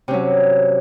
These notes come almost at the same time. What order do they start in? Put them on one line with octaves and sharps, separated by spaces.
C3 C#4 F#3